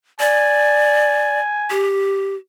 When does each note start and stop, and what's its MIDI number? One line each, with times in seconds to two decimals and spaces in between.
0.20 1.40 74
0.20 1.93 80
1.70 2.36 67